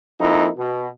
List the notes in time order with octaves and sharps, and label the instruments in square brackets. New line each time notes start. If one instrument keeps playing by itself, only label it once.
[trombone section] F2 A#3 D#4 E4
B2